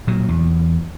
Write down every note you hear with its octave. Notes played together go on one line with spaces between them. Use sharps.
A#2 F#3
E2